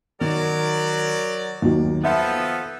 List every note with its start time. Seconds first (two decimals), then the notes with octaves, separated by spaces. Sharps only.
0.21 D#3 F#3 A#4 D5
1.62 D#2 D#3 F#3
2.04 F3 B3 A4 E5